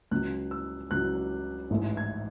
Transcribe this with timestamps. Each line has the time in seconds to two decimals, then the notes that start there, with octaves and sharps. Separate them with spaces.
0.11 C#2 C#3 F#3 F#6
0.51 E6
0.91 C#2 C#3 F#3 F#6
1.71 A1 G#2 E3 A3
1.97 G#6